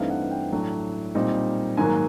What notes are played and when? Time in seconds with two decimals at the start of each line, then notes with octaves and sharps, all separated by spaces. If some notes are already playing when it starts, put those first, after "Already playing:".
Already playing: G2 E3 A3 C4 D#4 F5
0.10 F#5
0.31 G5
0.52 A2 F#3 A3 D4
1.15 A#2 G3 C4 D#4
1.77 G#2 D#3 F#3 A#3 G#5